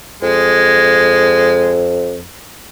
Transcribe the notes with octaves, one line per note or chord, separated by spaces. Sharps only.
F2 G#3